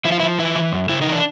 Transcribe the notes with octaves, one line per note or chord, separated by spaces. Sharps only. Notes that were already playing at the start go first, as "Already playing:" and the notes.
F3 E4
F4
E4
F3
E3 E4
E3
F#2
C#3 E4
D#4
E3
D4